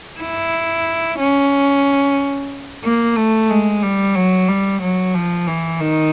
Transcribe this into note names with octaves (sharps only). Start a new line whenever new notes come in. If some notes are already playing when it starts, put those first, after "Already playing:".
E4
C#4
A#3
A3
G#3
G3
F#3
G3
F#3
F3
E3
D#3